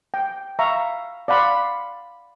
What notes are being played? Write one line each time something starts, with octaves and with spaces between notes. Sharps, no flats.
G5
E5 F5 A#5 C#6
D5 F5 F#5 B5 C6